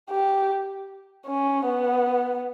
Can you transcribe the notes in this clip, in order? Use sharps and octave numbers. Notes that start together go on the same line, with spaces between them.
G4
C#4
B3